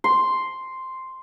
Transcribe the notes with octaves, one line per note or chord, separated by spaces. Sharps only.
C6